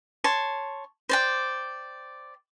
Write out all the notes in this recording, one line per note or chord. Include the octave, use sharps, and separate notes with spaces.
C#5 A5 C6
C5 D5 G5